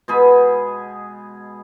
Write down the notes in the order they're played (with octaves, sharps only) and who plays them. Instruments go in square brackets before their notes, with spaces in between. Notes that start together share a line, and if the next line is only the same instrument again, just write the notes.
[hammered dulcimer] B2 G#3 G#4 B5